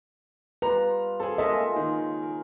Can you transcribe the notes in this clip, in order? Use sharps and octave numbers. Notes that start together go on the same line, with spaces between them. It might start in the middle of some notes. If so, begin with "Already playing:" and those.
G3 F4 B4 A#5
C4 G#4 A4
A#2 C#3 G#3 A#3 A4 D#5 E5
D#3
A#4